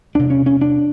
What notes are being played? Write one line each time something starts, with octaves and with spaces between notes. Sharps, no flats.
E2 C3 D4
C#4
C#4
D4